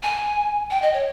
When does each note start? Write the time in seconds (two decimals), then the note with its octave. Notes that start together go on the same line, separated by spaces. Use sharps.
0.03 G#5
0.71 G5
0.82 D#5
0.94 C#5